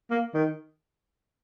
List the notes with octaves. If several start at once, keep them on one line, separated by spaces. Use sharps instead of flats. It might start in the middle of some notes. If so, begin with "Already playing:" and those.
A#3
D#3